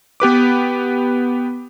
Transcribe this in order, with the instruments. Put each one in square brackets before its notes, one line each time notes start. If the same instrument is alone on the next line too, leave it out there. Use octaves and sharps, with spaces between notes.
[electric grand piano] B3 G4 B4 D6